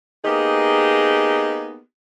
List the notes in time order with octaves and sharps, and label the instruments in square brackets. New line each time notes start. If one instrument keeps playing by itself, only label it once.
[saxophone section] A#3 B3 D#4 G4 G#4